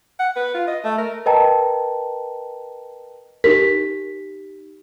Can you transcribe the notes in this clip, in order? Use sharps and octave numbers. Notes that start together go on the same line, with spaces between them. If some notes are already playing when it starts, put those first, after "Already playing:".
F#5
B4
F4
D#5
A3
A#4
A#4 B4 D#5 G5 A5 A#5
D#4 G4 A#4 B6